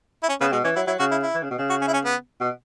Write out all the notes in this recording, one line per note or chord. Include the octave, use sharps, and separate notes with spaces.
E4
C#4
C#3 B3
B2 G#3
E3 C#4
F#3 E4
F#3 E4
C#3 F#4
E4
E4
E3
C#3
B2
C#3
F#4
C#4
E4
C#4
B3
B2